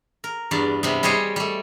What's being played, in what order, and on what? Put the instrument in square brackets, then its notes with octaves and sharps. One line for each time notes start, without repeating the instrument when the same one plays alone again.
[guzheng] A#4
E2 G2 B3 D5
C3 G3 B3
G3 G#4 C5 C#5 D#5 G5
G3 A3